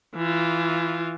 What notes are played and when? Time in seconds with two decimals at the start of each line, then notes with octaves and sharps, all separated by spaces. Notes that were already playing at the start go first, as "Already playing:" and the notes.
0.15 E3 F4